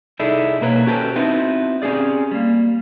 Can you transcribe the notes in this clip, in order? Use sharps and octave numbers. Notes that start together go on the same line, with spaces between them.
C2 D#4 E4 G#4 A4 D5
B2 A#3 A#4 B4 C#5
C#4 F#4 G4 A4 B4 C5
B3 C4 D#4 E4 F#4
C4 C#4 G4 G#4 D5
G3 A#3